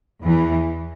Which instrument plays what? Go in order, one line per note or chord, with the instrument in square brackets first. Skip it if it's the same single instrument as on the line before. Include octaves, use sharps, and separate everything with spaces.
[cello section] E2 E3